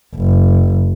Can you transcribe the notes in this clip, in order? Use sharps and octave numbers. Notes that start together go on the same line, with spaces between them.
F#1